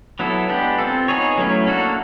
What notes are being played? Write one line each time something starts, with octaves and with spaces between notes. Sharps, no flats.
F#3 B3 E4 A4
G#3 B3 D4 G4
C4 F4 A4
B3 D#4 G#4 C#5
F#3 A3 C#4 E4
A#3 D4 F#4 A4